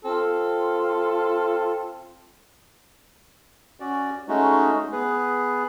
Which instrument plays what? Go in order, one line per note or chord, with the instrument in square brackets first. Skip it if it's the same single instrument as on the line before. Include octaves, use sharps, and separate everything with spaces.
[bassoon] C4 [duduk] F4 [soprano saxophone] A4
[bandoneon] C#4 F#4 D5
G#3 A3 C#4 D#4 F#4
B3 G#4 B4